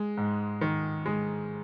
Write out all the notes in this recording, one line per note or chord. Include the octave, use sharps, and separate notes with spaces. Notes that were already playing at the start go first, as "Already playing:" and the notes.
Already playing: G#3
G#2
D#3
G#3